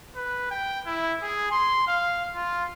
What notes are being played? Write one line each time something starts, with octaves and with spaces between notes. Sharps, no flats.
B4
G5
E4
G#4
C6
F5
F4